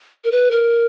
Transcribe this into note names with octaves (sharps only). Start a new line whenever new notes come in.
A#4
B4
A#4